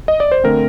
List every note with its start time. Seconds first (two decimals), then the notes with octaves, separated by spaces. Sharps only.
0.08 D#5
0.20 D5
0.32 C5
0.44 D3 A3 C4 A#4